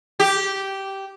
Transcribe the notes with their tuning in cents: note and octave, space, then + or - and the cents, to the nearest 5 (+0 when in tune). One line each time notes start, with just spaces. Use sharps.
G4 -10